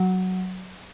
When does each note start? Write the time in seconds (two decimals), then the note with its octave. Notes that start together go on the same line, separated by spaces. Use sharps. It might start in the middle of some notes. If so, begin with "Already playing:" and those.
Already playing: F#3